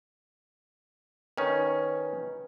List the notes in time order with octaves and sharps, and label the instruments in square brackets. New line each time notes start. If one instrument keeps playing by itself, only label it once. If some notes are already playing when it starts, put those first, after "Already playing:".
[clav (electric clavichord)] D#3 C#4 [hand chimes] B4